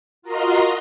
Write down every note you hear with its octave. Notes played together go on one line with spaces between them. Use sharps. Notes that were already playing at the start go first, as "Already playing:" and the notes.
F4 F#4 A#4 D#5 A#5 C6